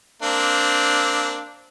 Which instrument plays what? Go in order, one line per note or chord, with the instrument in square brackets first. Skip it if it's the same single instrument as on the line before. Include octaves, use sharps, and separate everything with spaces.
[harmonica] A#3 C4 D4